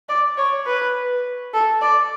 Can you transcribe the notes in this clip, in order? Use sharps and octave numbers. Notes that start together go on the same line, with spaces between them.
D5
C#5
B4
A4
D5